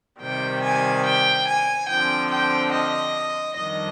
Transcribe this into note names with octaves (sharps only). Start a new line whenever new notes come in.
C3 D#3 G3 G5
G#5
G5
G#5
D3 F3 C4 G5
G5
D#5
F2 D#3 G3 D4 D#5